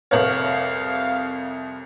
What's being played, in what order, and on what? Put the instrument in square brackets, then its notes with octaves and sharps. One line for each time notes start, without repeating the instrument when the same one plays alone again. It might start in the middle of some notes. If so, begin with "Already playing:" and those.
[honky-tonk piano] C2 F2 C#5 [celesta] B4 F#7 [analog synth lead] F5